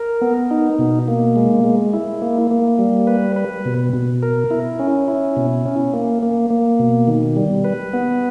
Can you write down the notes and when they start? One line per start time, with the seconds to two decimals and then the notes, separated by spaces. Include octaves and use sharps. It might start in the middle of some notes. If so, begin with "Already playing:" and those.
Already playing: A#4
0.21 B3
0.51 D#4
0.79 B2
1.08 A#3
1.36 G#3
1.64 G#3
1.93 E4
2.22 A#3
2.51 A#3
2.79 G3
3.07 B4
3.36 B4
3.65 B2
3.93 B2
4.23 A#4
4.51 E4
4.79 C#4
5.08 E4
5.36 B2
5.65 C#4
5.93 A#3
6.23 A#3
6.50 A#3
6.79 B2
7.08 D#3
7.36 G3
7.64 B4
7.93 B3